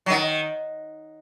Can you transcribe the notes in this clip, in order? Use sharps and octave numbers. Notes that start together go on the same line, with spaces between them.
F#3
D#3